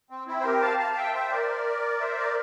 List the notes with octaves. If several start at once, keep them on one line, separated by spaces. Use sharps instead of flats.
C4
C4 E4
C5
G4 A#4
F5 A5
F5 A5
E5 G5
C5 E5
A#4 D5
C5 E5
A#4 D5